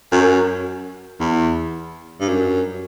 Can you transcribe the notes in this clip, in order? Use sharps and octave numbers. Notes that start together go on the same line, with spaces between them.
F#2
E2
G2
F#2